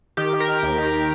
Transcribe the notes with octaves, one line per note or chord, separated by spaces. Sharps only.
D#3 G4
D#3
A#4
D#3
D#2
D#3